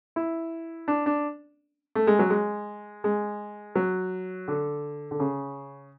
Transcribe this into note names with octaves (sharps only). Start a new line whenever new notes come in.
E4
D4
D4
A3
G#3
F#3
G#3
G#3
F#3
D3
D3
C#3